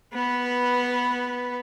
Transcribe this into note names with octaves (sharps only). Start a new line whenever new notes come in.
B3 B4